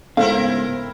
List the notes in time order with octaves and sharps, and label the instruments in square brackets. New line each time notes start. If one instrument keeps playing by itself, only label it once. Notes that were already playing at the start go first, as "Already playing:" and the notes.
[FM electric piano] G#2 C#3 A3 [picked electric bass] B3 [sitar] C4 E4 A#4 [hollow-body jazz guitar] F5